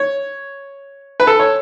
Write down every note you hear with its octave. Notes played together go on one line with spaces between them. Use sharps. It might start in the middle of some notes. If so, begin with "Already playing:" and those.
Already playing: C#5
B4
A4
C#5